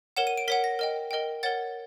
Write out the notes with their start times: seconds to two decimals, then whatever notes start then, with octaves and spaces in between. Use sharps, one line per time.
0.17 A#4 C#5 F#5 E7
0.27 D#7
0.38 D7
0.48 A#4 C#5 F#5 B6
0.64 A#6
0.79 A#4 D#5 G5
1.11 A#4 D#5 G5
1.43 A#4 C#5 F#5 A6